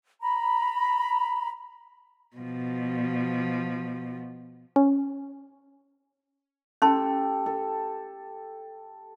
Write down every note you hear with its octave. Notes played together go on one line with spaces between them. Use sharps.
A#5 B5
B2 F3
C#4
C#4 G4 A4 A5 C6
A4